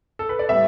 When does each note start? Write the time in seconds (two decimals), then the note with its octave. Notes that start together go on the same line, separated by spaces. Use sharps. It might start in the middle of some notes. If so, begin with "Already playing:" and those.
0.19 A4
0.29 B4
0.39 D5
0.49 A2 G3 B3 E5